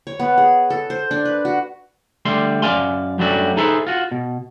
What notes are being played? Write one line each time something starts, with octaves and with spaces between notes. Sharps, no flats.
C#5
B3
G#4
A4
C5
D4
B4
F#4
D3 G3 A3 C6
F#2 B3 D5 F5 G#5 C6
F#2 F#3 G3 A3 D4 F#4
D#4 G#4 A4 B4 C5 E5
F4 F#4
B2